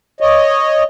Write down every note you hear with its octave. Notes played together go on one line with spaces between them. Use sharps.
C#5 D#5